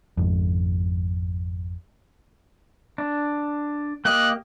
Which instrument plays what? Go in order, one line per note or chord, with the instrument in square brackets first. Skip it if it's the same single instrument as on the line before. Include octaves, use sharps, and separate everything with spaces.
[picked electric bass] G#1 F2
[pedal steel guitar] D4
[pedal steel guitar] A#3 G4 D#5 [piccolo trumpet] F#6